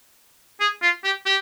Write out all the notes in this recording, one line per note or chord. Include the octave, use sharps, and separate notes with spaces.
G#4
F4
G4
G4